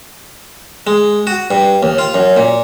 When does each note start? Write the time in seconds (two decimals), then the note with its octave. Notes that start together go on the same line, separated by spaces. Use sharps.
0.87 G#3
1.27 F#4
1.51 G2
1.83 D#2
1.98 F4
2.14 F#2
2.37 A#2